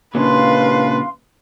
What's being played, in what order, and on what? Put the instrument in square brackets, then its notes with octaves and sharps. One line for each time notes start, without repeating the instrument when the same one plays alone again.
[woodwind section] D#2 E3 D4 [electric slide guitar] A#2 C#3 [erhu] B4 [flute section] F5 C6